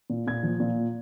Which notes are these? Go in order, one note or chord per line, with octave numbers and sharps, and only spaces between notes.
A#2
A#2 G#6
F3
A#2